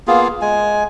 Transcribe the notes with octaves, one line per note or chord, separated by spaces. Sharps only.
A#3 B3 F4 G#4
G#3 G#5